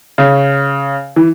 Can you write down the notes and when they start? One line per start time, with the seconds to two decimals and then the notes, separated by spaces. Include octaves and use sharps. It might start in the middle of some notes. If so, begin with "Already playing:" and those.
0.18 C#3
1.16 E3